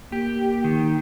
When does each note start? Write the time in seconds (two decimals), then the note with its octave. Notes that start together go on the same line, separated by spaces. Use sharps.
0.12 A#3 G4
0.64 D#3